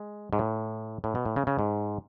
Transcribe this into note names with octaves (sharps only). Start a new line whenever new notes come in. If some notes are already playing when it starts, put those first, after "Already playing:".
Already playing: G#3
G#2
A2
A2
B2
A2
C#3
C#3
G#2